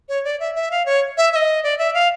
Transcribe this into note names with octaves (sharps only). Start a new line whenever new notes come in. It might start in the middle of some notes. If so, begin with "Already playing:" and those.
C#5
D5
E5
E5
F5
C#5
E5
E5
D#5
D5
E5
F5